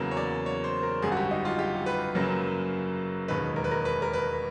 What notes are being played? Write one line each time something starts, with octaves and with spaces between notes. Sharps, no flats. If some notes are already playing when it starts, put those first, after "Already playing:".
Already playing: E2 C#3 F#3 A#3
C#5
D5
C#5
C5
A#4
G#1 F#2 D3 G3 G#4
F#4
G4
D#4
F4
G4
B4
F#2 C#3 F#3 A#3
E1 D#2 D#3 G#3 B4
A#4
B4
A#4
B4
A#4
B4